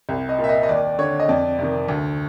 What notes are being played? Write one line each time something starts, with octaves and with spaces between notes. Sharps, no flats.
C2
D#5
A#2
E5
D#5
D#5
D#2 D5
D3 C#5
D#5
F2 D5
C3 D#3
D2